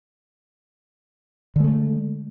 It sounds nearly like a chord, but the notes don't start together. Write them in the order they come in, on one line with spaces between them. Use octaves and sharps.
D3 G#3 A3